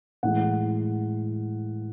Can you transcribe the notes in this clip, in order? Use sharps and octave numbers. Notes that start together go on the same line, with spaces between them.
A2 E3 G#3 F#5